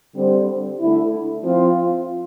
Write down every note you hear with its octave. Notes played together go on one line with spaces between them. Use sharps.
D3 G3 C4
D3 A3 E4
F3 C4 F4